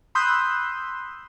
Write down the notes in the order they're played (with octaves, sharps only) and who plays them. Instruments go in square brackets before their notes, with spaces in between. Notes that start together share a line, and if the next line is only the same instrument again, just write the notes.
[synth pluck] B5 C6 D#6 E6 F#6 G6